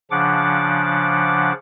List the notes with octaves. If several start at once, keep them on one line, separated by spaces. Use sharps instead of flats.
C#3 F3 D4 F#5 D6